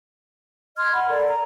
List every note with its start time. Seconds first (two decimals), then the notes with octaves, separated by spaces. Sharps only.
0.77 D#5 C6 F6 G#6
0.93 F#5 B5
1.09 A4 A#4 D5
1.28 A#5